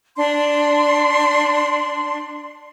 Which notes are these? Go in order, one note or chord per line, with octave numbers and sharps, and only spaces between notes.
D4 C6